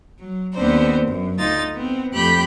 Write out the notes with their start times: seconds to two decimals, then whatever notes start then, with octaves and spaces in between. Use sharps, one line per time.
0.19 F#3
0.53 D#2 B3 C4 D4 C5
1.07 F#2
1.38 D2 D#4 F4 A6
1.74 B3 C4
2.12 F2 A3 G4 B5 F#6 G6